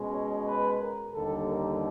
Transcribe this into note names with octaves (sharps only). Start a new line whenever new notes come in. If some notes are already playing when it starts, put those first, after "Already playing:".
Already playing: B2 G#3 C#4
C#5
B4
A#4
D#2 D3 G3 A4
A#4